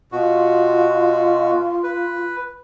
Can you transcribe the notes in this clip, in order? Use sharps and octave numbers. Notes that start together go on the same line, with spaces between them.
B2 F4 F#4
B4